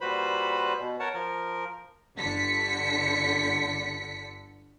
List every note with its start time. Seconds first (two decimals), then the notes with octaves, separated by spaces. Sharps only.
0.01 A#2 G3 F#4 B4 C5 B5
0.79 B2
1.00 A#4 C#5 F#5 A5
1.14 F3 A#4
2.17 G1 D3 B6 C#7